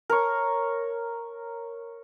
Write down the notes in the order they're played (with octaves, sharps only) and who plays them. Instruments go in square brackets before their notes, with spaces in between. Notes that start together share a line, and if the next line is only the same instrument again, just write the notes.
[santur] A#4 C#5